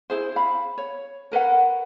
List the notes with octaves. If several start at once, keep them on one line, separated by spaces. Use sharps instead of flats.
E4 G#4 C5
F5 B5
C#5
A#4 B4 C#5 F#5